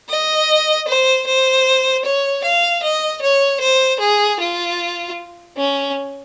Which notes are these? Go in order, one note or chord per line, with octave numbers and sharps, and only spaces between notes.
D#5
C5
C5
C#5
F5
D#5
C#5
C5
G#4
F4
C#4